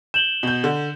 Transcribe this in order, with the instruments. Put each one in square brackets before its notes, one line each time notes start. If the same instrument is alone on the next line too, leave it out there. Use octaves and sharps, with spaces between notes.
[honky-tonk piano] G6 [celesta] E7 F#7 G7
[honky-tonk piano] B2 G6
D3